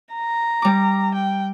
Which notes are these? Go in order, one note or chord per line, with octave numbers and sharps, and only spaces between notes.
A#5
G3 D6
G5